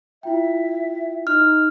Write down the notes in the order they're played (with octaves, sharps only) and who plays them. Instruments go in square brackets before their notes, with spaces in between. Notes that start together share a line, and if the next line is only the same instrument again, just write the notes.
[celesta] E4 F4 G5 [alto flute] E5
[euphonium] D#4 [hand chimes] F6